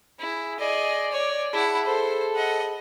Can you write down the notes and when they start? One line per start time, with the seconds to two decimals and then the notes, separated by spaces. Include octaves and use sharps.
0.20 E4 G#4
0.59 G#4 D5 D#5
1.12 C#5
1.53 E4 G#4 F#5 A5 B5
1.85 A4 C5
2.36 D#5 F#5